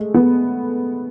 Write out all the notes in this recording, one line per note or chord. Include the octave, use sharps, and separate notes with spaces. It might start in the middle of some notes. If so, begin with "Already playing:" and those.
Already playing: G#3 A3
B3